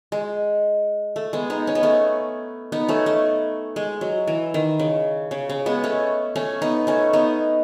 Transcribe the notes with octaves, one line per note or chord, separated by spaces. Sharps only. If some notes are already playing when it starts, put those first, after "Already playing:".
G#3
A3
G#3 B3
B3 D#4
C#4
B3
A3 C#4
B3 D#4
A3 C#4
A3
G#3
F#3
E3
D#3
C#3
C#3
C#3
G#3 B3
A3 C#4
A3 C#4
B3 D#4
A3 C#4
B3 D#4